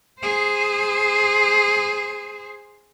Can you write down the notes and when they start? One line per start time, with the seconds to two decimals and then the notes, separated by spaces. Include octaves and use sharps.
0.20 G#4 C5